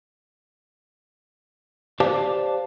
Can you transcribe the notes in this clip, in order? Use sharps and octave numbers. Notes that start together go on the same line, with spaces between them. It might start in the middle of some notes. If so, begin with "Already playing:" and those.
G4 B4 C5 D5 F5 A5